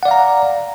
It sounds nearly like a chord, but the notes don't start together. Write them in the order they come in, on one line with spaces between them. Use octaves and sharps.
F#5 D5 F5 A#5